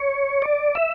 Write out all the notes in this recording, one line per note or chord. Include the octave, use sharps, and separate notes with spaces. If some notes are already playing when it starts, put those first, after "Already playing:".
Already playing: C#5
D5
E5